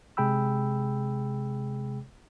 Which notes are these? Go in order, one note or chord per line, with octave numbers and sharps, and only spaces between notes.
C3 G#3 G#4 G5 B5 E6